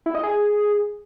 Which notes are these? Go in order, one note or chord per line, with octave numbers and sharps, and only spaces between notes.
E4
D#5
G#4